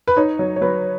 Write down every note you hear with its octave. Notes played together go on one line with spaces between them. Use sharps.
B4
D#4 C#5
F#3
C#5
F#3 B4